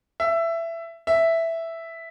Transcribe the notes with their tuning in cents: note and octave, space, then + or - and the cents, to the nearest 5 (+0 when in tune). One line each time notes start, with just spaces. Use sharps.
E5 +15
E5 +0